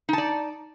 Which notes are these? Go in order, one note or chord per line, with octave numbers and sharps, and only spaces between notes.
D#4 D5 A5